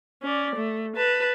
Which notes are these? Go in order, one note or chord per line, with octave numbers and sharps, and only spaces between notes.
C#4 D5
A3
B4 A5